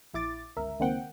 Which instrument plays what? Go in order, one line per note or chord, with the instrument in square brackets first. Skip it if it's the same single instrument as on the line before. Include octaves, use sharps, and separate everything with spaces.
[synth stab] A#1 E4 D6 A6
G1 C#2 A#4 E5
C#2 D#3 A#3 C4 F#5 G5